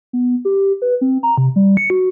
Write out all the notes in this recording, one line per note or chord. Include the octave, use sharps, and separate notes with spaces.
B3
G4
B4
C4
A#5
C3
G3
C#7
F#4